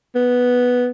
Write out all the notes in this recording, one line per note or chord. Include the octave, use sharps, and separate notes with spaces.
B3